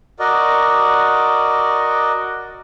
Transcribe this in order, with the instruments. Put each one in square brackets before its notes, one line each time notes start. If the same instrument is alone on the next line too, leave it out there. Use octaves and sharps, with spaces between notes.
[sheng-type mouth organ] F#4 A#4 D5 D#5